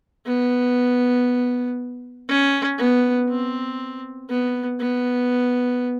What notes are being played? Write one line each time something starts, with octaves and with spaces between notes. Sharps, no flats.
B3
C#4
B3
C4
B3
B3